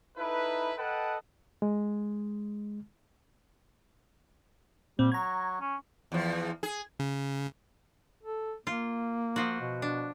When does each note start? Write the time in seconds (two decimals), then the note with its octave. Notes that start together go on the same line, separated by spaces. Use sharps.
0.17 D#4 E4 A4 B4
0.77 A4 B4 D#5 F#5 G5 A5
1.62 G#3
4.99 A#2 G3 C4
5.12 F#3 A#5 G#6
5.60 C#4
6.12 E2 F3
6.63 G#4
6.99 C#3
8.23 A4
8.67 A#3 F4
9.36 F3 F4 F#4
9.61 B2
9.82 D4